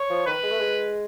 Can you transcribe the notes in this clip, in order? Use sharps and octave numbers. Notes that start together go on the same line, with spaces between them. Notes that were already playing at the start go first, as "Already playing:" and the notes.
Already playing: C#5
F3
D#3 B4
G#3
A3
G#3